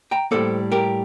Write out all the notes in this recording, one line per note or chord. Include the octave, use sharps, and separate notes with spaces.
G5 A#5
A2 G3 A#3 A4 C5
G4 A#4